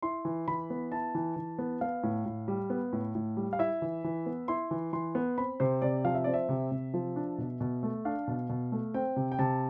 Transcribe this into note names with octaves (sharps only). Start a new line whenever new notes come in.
E4 C6
E3
E3 B5
B3
E4 A5
E3
E3
B3
B3 F5
A2
A2
G3
B3
A2
A2
G3
F5
E4 E5
E3
E3
B3
E4 C6
E3
E3 C6
B3
C4 B5
C3 C5
C3 D5
F3 F5
E5
C4 D5
E5
C3
C3
F3
D4
B2
B2
A3
D4 F5
B2
B2
A3
C4 G5
C3
G5
C3 A5